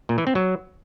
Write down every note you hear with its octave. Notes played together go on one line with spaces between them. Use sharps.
A#2
E3
C4
F#3